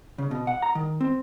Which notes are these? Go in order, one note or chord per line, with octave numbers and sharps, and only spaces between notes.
C#3
B2
F#5
A#5
D#3
C4